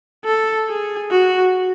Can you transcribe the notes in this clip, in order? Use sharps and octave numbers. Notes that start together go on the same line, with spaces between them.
A4
G#4
F#4